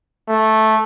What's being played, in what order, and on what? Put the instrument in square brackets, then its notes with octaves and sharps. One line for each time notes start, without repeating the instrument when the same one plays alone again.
[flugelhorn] A3